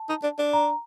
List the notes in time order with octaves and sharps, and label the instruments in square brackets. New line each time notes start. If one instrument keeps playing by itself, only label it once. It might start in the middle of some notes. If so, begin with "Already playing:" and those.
Already playing: [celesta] A5
[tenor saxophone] D#4
D4
D4
[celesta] A#5